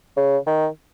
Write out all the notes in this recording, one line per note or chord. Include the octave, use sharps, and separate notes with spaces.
C#3
D#3